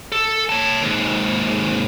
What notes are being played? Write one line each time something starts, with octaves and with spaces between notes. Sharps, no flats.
A4
C#5 A5
D#2 G#2